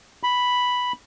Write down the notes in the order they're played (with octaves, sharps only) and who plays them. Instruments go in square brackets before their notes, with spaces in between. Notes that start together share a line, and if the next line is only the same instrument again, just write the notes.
[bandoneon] B5